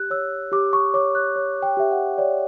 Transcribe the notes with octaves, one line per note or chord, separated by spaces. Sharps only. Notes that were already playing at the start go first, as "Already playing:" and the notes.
Already playing: G4 F#6
C#5 E6
G4 D6
C#6
C#5 D6
F#6
C#5
G5
G4 E5
F#5
C#5 D5